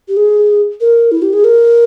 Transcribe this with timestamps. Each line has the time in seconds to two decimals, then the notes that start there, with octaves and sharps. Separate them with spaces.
0.08 G4
0.17 G#4
0.81 A#4
1.12 E4
1.22 G4
1.33 G#4
1.44 A#4